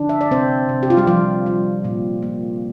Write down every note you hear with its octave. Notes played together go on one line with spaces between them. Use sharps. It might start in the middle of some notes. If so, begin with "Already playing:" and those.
Already playing: D3 F3 D4
E5
D5
C3 C4 C5
C3
G4
F4
G3 G4
F3 G3 F4
G3
A#2
A#3